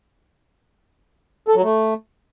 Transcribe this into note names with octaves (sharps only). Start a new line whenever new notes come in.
A4
F#3
A3